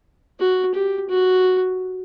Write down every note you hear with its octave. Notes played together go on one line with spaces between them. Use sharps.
F#4
G4
F#4